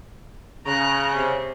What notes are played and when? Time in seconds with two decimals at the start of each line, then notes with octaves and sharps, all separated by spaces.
0.66 C#3 A#5 F#6
1.15 C3